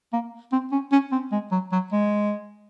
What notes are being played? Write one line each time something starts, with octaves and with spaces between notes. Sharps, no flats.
A#3
C4
C#4
C#4
C4
G#3
F#3
F#3
G#3